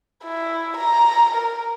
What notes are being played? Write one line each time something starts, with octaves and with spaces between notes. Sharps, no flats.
E4
A#5
A#4